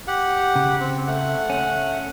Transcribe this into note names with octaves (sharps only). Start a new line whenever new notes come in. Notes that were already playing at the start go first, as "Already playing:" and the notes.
G4 F#5
C#3
C4
A3 F#5
C#4